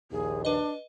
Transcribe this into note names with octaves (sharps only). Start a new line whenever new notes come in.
A#1 D#2 G#4
D4 B4 D#5